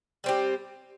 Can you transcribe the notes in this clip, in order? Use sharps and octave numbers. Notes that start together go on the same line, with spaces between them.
G3 C4 G4